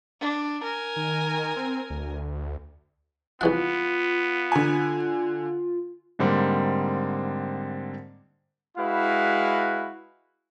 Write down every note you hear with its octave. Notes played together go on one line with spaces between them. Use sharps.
D4
A#4 G#5
D#3
C4
D2
C2 E3 B3 F4 F#5
D3 G#5
G#2 D3 G3 A#3 C4
G#3 E4 F#4 B4 F5